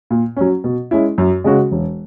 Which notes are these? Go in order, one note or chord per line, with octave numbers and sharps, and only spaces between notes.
A#2
F#3 C#4
B2
G#3 C#4 E4
F#2
C#3 G#3 C#4 F#4
E1